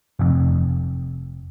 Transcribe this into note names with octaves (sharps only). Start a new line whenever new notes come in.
F1 F2